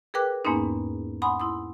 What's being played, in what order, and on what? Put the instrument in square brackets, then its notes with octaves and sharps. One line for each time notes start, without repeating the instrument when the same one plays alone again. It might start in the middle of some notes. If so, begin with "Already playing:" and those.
[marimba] G#4 A#4 B4 G5 D6 F#6
E2 G#2 A#3 B3 C#4 D#4
F#5 G#5 B5 C6 D#6
E4 C6 D#6